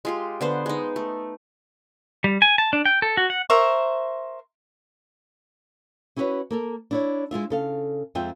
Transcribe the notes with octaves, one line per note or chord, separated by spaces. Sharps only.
G#3 F4 G4
D3 B3 C5
G#3 D#4
A3
G3
G#5
A5
D4
G5
A4
F#4
F#5
A#4 C5 E5 C#6
C#4 E4 F#4 G4 B4 C#5
A#3 A4 A#4
D4 E4 C#5
G#3 E4 F4 E5
C#3 A4 F5
F2 G#3 C4 F4 E5 G5